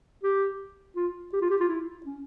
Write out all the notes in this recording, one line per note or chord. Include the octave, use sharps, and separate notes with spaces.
G4
F4
G4
F4
G4
F4
E4
C#4